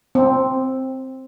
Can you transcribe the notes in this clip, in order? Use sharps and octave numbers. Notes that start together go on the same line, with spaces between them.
C4